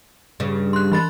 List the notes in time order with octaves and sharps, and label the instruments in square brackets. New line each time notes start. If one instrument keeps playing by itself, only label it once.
[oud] G2 C#3
[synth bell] C6 F#6
E3 B5 A6